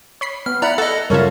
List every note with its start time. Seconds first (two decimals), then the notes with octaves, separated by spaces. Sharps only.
0.21 C#5 B5 C7
0.46 B3 F6
0.62 E4 D5 F#5 A#5 B5
0.78 A4 D#5 F#5 A5
1.10 F#2 C#3 G3 F4 A4 A#4 C#5 E5